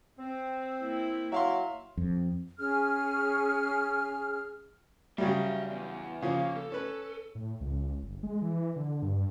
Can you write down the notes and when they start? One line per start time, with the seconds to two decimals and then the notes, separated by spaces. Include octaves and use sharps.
0.19 C4
0.80 A#3 E4
1.32 F#3 E5 F5 C6
1.97 F2
2.59 C#4 G#4 F6
5.18 C#3 F#3 G3 D5 E5
5.70 E2
6.22 C#3 F3 A#3 C#4 F5
6.56 A4
6.72 C#4 B4
7.35 A2
7.60 C#2
8.03 G1
8.23 G#3
8.42 E3
8.76 D3
9.02 G2